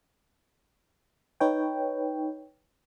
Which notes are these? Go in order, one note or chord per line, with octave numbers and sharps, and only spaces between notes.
D#4 B4 C#5 G5